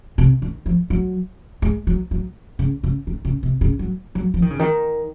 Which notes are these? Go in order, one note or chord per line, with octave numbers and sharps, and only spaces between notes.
C3
D#3
F3
F#3
G#3
F#3
F#3
C#3
C#3
D#3
C#3
C3
C#3
F#3
F#3
F3
D#3
C#3
D#3